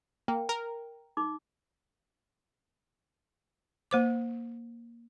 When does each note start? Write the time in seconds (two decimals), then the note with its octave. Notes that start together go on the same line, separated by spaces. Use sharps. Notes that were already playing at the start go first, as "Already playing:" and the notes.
0.28 A#3 G5
0.49 A#4
1.17 D#4 D6
3.91 A#3 C5 D6